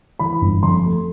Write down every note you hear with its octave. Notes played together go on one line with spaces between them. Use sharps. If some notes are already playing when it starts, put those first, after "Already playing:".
E3 B5
G1
F2 C6
A3